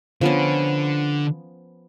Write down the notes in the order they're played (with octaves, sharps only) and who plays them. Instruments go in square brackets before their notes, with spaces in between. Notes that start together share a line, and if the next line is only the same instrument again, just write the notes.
[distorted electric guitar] D3 [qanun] F3 B3 C#4